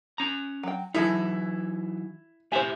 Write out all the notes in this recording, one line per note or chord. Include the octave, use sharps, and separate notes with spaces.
C#4 A#5
F#3 G5
E3 F#3 D#4 E4 G#4 A4
A2 G4 C5 E5 G#5